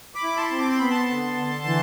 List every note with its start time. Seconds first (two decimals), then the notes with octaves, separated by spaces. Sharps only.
0.15 B5 D6
0.23 E4
0.37 A5 C6
0.51 C4
0.58 D6
0.69 C6
0.79 B3 B5
0.89 A5 C6
1.09 D3
1.37 D3
1.66 E3